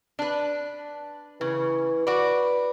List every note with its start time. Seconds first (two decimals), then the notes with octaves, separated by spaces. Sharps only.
0.19 D4 B4
1.41 C#3 E3
2.07 F#4 B4 D5